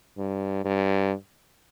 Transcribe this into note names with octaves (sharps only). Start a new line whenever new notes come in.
G2
G2